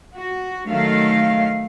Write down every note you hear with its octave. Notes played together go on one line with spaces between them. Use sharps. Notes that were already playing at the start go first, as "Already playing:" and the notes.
F#4
D#3 F#3 A3 F5